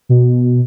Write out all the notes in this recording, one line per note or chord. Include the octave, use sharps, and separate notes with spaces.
B2